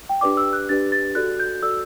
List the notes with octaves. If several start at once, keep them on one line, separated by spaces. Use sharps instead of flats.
G5
D4 G4 B4 D5 D6
E6
F#6
D4 G4 B4 D5 A6
A6
F#4 A4 D5 F#6
G6
F#4 A4 D5 E6